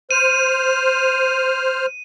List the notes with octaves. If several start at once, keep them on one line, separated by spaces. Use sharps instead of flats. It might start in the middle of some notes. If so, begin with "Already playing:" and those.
C5 F6 D#7